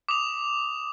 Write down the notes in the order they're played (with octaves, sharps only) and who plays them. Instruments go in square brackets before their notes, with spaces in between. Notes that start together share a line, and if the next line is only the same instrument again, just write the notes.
[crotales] D6 D#6 F7